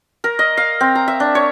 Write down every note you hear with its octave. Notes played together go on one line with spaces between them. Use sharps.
A#4
D#5
F5
C4
A#5
E5
D4
C#5